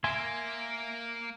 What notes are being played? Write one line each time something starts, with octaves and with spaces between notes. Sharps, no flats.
A#3 E5 G#5 C6